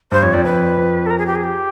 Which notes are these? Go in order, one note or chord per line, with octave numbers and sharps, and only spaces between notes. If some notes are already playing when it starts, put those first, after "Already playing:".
G2 C5
F2 C#5
F2 D5
F2 B4
F2
A4
A#4
G#4
G4
G#4
G4